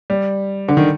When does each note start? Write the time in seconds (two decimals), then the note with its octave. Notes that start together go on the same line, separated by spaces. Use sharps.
0.10 G3
0.68 D3
0.77 D#3